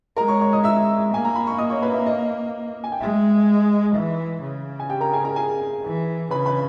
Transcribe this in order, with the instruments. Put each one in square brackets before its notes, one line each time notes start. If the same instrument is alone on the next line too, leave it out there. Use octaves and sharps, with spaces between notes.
[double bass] G#3 [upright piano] A#4 A#5
[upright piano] C#5 C#6
C#5 C#6
D#5 D#6
E5 E6
[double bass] A#3 [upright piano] G#5
[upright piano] A#5
B5
C#6
D#5 D#6
C#5 C#6
B4 B5
E5
D#5
G#5
G5
[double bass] G#3 [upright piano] E5
[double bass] E3 [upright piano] E5
[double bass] C#3
[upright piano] G#5
G4 G5
A#4 A#5
G#4 G#5
A#4 A#5
G#4 G#5
[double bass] E3
[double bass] C#3 [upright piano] B4 B5
[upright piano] B4 B5